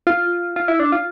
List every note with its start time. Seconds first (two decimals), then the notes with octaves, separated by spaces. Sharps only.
0.07 F4
0.56 F4
0.68 E4
0.80 D4
0.92 F4